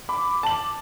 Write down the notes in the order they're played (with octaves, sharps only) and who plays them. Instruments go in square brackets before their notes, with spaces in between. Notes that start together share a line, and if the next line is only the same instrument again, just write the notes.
[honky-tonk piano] B5 [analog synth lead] D6
[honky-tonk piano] A5 F#7